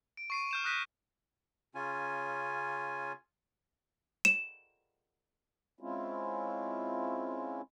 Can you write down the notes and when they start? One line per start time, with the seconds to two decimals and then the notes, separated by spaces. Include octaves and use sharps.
0.17 D7
0.30 C#6 C7 D#7
0.51 F6 G6 E7
0.64 D#6 F6 F#6 A#6 B6 D#7
1.75 C#3 C#4 F4 G#5
4.25 E7
5.80 G#3 C4 C#4 E4 F4